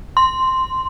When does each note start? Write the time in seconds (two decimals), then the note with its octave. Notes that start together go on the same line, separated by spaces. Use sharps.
0.17 C6